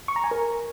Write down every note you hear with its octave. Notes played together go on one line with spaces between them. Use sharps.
C#6
A#5
G#5
A#4